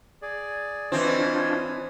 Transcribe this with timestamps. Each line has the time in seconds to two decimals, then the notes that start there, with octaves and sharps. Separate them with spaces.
0.22 G#4 D5
0.92 E3 C4 D4 F4 C#5 D#5 G#5